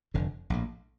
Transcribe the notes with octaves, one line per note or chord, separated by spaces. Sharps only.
F1 F2 D3
A#1 A2